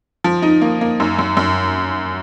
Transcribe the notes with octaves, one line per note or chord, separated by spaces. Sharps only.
F3
D#4
A#3
A#3
F#2
F#2
F#2